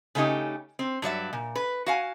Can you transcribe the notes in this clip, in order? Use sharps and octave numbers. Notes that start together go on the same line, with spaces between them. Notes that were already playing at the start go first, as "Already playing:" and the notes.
C#3 A3 C#4 D#4 G4
C4
G2 F#3 D5 E5
A#2
B4
F#4 F5 G#5